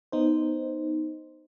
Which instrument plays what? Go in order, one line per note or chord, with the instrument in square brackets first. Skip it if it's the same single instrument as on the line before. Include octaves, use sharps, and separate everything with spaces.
[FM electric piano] B3 D#4 C5